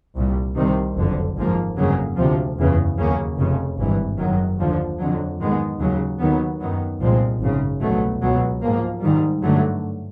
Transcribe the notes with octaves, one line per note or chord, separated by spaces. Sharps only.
C2 A#2 G3
C2 C3 D#3 G3 C4
F#1 F2 D3
G#1 G#2 F3 A#3
G1 F2 C#3 F#3 A#3
D2 C3 F3
F#1 E2 C#3 E3
D#2 C#3 F#3 A#3 C#4
F1 F2 C#3
G#1 G2 E3
F#1 F#2 D#3 F#3
D#2 D3 F3
F2 D3 F#3
G#2 D#3 G#3 B3
D#2 C#3 F#3
D#2 D#3 F#3 B3
F#2 D#3 F#3 B3
C2 A#2 F3 G#3 C4
G#1 F#2 C#3
C2 B2 F#3 A3
C#2 B2 F#3
G#2 F3 A#3
G#2 D#3 G3
G2 D3 F#3 A3